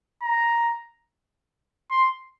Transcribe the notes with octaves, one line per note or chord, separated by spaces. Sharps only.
A#5
C6